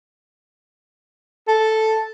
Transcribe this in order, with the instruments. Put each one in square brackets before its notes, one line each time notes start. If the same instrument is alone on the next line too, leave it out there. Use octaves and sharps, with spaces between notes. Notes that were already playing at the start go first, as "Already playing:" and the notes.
[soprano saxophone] A4